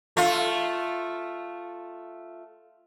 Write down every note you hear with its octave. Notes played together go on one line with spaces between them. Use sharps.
A3 F4